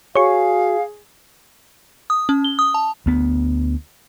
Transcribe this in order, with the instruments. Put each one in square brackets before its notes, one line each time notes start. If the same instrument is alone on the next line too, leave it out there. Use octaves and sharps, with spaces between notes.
[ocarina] F#4 [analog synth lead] G#4 [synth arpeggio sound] C#5 C#6 [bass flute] F5
[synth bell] D#6
C#4
G7
D#6
A5
[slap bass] D2 B3